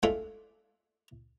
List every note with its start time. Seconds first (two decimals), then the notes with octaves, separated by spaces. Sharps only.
0.03 G#3 A3 D4 F4 A4